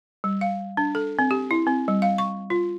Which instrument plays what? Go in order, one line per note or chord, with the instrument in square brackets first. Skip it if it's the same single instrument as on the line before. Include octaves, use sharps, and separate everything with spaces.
[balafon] G3
F5
D4
A4
C4
G4
E4
C4
G3
F5
C#6
F4